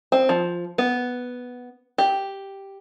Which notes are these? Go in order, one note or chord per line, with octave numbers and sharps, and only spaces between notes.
C4
F3
B3
G4